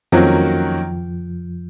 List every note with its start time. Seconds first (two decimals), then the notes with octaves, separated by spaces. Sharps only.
0.12 F2 D#3 F3 F#3 A#3 C#4 F#4